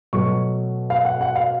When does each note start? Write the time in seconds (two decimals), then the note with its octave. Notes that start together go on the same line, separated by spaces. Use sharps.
0.13 B2 F#3 A3 C#6
0.90 F5
1.05 F#5
1.21 F#5
1.36 F5